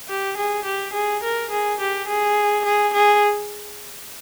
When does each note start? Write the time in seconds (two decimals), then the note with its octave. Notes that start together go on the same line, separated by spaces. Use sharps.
0.08 G4
0.37 G#4
0.65 G4
0.93 G#4
1.23 A#4
1.50 G#4
1.80 G4
2.08 G#4
2.65 G#4
2.94 G#4